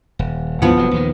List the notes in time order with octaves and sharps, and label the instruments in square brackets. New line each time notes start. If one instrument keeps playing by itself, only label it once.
[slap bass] D#1
[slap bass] C#2 G2 E3 [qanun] F3 B3 F#5
[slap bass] F1 C3 F#3
D#2 A#2 D#3